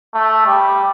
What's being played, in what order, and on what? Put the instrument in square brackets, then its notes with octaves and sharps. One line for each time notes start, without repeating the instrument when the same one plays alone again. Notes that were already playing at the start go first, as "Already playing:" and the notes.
[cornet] A3
G3